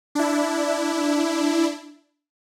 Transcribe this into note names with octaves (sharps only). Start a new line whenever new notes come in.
D4 E4